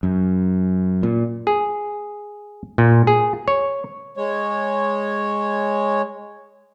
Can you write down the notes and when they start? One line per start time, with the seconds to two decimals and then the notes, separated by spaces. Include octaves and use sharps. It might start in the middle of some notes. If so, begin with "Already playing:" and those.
0.03 F#2
1.03 A#2
1.47 G#4
2.78 A#2
3.07 G#4
3.48 C#5
4.17 G#3 C#5